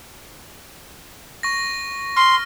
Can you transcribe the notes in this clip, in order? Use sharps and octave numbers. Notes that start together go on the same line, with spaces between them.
C#6 A#6
C6 F6